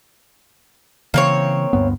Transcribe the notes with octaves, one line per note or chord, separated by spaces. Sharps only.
C#3 E3 A#3 C4 C#5
D2 G2 B3